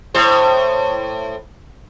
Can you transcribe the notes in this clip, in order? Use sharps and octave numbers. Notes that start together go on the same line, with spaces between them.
A2 C5